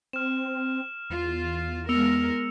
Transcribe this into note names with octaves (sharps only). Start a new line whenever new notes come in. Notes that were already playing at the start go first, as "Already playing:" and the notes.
C4 F6 E7
E2 F4
G#3 B3 A#4 E6 C#7 F7